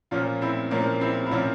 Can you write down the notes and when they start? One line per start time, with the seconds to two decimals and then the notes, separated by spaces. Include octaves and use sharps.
0.11 A#2 F3 C#4 F4
0.41 C4 E4
0.71 A#2 F3 A#3 C#4
1.01 C4 E4
1.26 E4
1.31 A#2 F3 C#4 F4